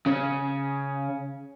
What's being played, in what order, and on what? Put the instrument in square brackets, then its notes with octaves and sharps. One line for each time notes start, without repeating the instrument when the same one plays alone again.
[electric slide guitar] C#3 C#4